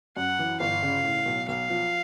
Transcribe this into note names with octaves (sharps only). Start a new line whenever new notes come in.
F#2 F#5
E3
G1 F5
C#3
A2
B1
B1 F5
F3